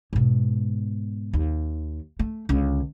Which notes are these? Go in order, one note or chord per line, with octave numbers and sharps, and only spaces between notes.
G#2 B2
D#2
A3
C#2 D3